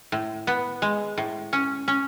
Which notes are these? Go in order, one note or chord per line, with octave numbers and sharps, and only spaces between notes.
A2
B3
G#3
A2
C#4
C#4